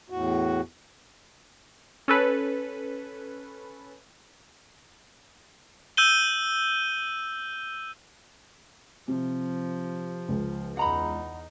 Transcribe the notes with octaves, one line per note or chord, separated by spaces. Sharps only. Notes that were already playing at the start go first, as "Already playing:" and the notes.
E2 A2 F#4
C#4 A4 B4
E6 G6 D#7 G7
C3 F3
C#2
E2 D#4 F#5 A#5 B5